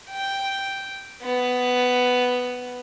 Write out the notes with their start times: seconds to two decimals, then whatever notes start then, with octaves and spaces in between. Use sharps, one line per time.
0.10 G5
1.23 B3